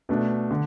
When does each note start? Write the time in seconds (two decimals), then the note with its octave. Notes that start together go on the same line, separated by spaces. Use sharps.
0.09 B2 A3 D4
0.51 D3